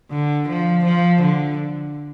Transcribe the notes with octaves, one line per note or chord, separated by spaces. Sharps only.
D3
F3
F3
D3